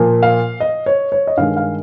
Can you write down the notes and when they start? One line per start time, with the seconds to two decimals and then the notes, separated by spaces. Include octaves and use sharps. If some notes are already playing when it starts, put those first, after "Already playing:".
Already playing: A#2 F3 A#3
0.23 F5
0.60 D#5
0.86 C#5
1.12 C#5
1.27 D#5
1.37 G2 D#3 G#3 F5
1.57 F5